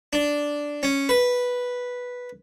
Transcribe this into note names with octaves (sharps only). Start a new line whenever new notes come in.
D4
C#4
B4